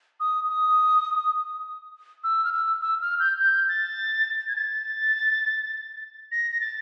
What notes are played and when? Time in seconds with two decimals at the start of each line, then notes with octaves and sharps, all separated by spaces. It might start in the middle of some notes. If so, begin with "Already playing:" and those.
0.20 D#6
0.49 D#6
2.24 E6
2.45 F6
2.52 E6
2.81 E6
3.01 F6
3.20 G6
3.39 G6
3.68 A6
4.48 G#6
4.56 A6
6.32 A#6
6.51 A#6
6.61 A6